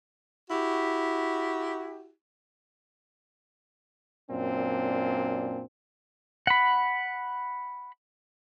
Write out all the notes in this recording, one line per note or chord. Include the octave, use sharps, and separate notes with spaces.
E4 F#4 G4
F#2 A#2 C4 D4
F#5 B5